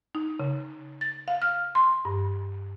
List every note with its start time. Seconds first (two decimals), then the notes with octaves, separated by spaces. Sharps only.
0.15 D#4
0.40 C#3
1.01 A6
1.28 F5
1.42 F6
1.75 C6
2.05 G2